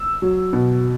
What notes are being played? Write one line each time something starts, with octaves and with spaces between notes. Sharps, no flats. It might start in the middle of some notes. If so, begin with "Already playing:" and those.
Already playing: E6
F#3
B2